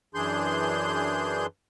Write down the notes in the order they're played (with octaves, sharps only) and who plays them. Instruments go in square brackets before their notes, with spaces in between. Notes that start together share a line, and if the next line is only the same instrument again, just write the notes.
[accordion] F#2 E3 D4 G#4 C6 G6